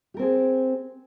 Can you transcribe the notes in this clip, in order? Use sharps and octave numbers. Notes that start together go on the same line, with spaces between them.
C4 G4 G#4 A#4